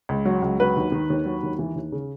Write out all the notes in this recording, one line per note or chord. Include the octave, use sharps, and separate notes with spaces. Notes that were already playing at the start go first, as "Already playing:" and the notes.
C#2
F#3
C#2
F#3 B4
D#2
D#3
D#2
F#3
D#2
E3
D#2
C#3